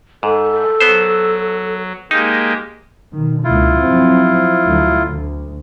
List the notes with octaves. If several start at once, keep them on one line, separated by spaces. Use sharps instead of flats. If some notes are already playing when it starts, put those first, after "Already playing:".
G#2 A4
F#3 B3 C5
G#3 A#3 D#4 G4
B2 D#3
C#2 A#2 D3 E4 F4
F2 F#3 C4
D2 F#3
D2